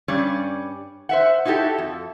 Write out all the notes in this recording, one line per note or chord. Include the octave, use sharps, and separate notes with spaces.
G2 G3 C#4 D5
C5 E5 F#5
D#4 E4 F#4 G4 A4
F2